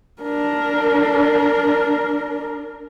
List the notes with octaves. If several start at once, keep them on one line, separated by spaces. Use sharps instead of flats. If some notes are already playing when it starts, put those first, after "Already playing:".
D4 A#4